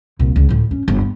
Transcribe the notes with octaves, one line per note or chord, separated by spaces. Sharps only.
C2 A#2
C#2
D2 A2
C#4
G1
B3